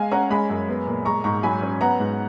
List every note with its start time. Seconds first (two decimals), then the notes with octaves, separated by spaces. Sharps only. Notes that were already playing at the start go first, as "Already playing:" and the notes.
Already playing: G#3 F5 G#5
0.11 C#4 F#5 A#5
0.30 G#3 G#5 B5
0.50 F#2
0.69 B3
0.86 A#2
1.05 G#3 A#5 C#6
1.24 G#2 A#5 C#6
1.43 F#3 G#5 B5
1.62 C#4
1.81 B3 F#5 A#5
2.00 G#2